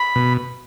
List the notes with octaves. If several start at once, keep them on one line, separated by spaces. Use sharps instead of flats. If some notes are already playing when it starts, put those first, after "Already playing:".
Already playing: B5
B2